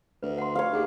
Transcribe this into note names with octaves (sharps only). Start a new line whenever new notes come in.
D2 B4
F#5 C6
C#5 F5
D#2 G4 G#4 F#5